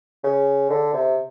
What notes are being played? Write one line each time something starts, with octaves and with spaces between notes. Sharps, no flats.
C#3
D3
C3